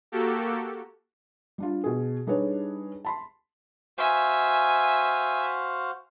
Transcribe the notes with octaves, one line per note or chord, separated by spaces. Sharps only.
A#3 F#4 G4 A4
G3 D4 F4
B2 G#4
G3 D4 D#4 G#4 B4 C#5
A5 B5 C6
F#4 C5 E5 F5 G#5